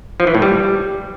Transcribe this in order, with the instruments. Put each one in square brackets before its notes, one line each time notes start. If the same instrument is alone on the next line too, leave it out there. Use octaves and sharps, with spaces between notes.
[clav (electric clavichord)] F3
E3
A2
G3